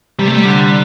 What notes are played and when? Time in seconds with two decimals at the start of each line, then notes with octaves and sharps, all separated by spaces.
0.19 C3 G3
0.28 A3
0.36 G3
0.45 D3